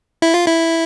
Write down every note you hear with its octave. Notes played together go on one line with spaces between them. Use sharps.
E4
F4
E4